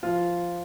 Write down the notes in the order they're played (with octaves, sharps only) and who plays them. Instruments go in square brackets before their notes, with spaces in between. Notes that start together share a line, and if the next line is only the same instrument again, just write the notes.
[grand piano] F3 F4